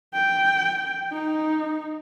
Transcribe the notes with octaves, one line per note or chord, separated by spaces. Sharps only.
G5
D#4